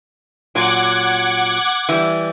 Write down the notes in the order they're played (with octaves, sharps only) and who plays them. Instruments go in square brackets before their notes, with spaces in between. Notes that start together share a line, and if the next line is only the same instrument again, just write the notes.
[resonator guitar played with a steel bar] A#2 F#3 [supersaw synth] F#5 D6 G#6
[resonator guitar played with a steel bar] E3 G3